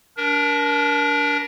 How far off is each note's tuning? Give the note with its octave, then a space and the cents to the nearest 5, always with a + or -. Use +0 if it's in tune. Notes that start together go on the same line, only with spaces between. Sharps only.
D4 -25 A#4 +20